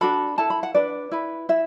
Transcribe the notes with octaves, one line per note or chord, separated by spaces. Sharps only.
D4 F#4 A4 B5
E4 A4 A5
B5
F#5
D4 B4 D5
E4 B4
E4 E5